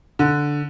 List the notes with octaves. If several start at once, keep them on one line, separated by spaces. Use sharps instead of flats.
D3